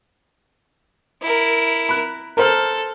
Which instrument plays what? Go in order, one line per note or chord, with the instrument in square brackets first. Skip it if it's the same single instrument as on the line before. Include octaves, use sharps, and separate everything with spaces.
[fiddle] E4 A#4
[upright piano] B5 F#6
[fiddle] A4 [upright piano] A#4 C5 F6